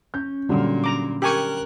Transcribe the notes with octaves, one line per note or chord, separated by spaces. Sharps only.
C#4 G6
A#2 D3 F#3 G3
A#5 D6
G4 A#4 G#5 C#6 F#6